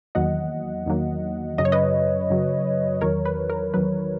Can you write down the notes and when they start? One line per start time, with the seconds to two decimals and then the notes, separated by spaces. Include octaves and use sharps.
0.15 E2 D#3 F#3 A#3 D#5 F#5
0.86 E2 D#3 F#3 A#3
1.58 F#2 C#3 F#3 D#5
1.65 C#5
1.72 B4 D#5
2.30 F#2 C#3 F#3
3.01 E2 D#3 F#3 A#4 C#5
3.25 B4
3.50 A#4
3.74 E2 D#3 F#3 B4